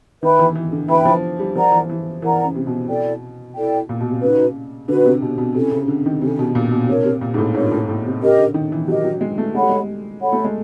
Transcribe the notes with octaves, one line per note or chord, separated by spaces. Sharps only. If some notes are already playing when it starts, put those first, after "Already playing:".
D#3 B4 E5 G5 B5
E3
E3
D3
E3 B4 E5 G5 B5
F3
G3
F3 A#4 D5 F#5 A#5
E3
E3
E3 A#4 D5 F#5 A#5
C#3
C3
B2
E4 A4 D5 G5
E4 A4 D5 G5
A#2
B2
C3
C#3 D#4 F#4 B4
D3 D#4 F#4 B4
C3
B2
B2
C3 C#4 E4 A4
C#3
D3
D#3
C3 C#4 E4 A4
B2
A#2
B2
C3 D4 F4 A#4 C#5
C3
A#2
G#2
A2
G#2 D4 F4 A#4 C#5
A2
A2
C3
C#3 G4 A#4 D#5
D3
D#3
E3
F#3 G4 A#4 D#5
F#3
G#3
A3
G#3 A4 C#5 F#5 B5
G3
G#3
A4 C#5 F#5 B5
A3
G#3